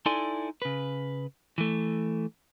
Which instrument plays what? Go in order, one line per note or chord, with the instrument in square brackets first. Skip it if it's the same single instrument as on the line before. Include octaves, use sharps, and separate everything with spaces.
[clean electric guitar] D#4 E4 A4 D5 G#5 C6
C#3 B4
E3 A3